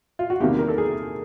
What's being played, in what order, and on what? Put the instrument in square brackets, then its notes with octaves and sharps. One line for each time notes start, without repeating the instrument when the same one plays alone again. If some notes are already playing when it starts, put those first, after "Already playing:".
[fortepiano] F4
F#4
E2 C3 D#3 G3 A#3 G4
A#4
A4
G#4